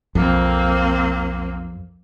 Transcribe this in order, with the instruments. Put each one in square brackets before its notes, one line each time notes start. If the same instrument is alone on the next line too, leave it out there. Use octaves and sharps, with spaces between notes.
[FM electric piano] B1 [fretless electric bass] F2 [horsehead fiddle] A#3 C4